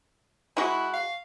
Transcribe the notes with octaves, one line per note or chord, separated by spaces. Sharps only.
G#3 E4 F#4
F5